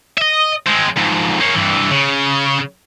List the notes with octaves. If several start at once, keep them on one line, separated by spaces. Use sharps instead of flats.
D#5 E5
G#3 C4
F2 G#2
A#3 C#4
G2 E3
C#3